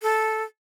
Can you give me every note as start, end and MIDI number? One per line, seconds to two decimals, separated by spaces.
0.02 0.43 69